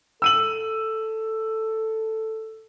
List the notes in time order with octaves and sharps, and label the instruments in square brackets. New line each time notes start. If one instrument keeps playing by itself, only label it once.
[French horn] A4 [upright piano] E6 D#7 F#7